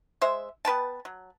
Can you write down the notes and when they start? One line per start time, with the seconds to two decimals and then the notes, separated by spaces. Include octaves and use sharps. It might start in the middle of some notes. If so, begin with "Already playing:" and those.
0.21 G#3 C5 E5
0.65 B3 B4 G5 A5
1.05 F#3